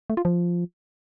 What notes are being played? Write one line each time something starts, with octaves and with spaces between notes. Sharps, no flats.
A3
F4
F3